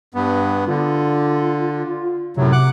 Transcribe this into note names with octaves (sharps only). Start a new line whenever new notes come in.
G2 B3
D3 F4
F#2 A2 C3 F#3
F#5 D6 F#6